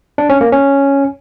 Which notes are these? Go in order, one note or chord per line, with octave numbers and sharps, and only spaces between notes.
D4
C#4
A#3
C#4